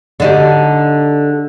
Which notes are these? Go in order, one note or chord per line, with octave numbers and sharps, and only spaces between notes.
D3 D#4 G4